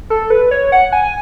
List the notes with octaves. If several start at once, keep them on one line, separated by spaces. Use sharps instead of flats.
A4
B4
C#5
F#5
G#5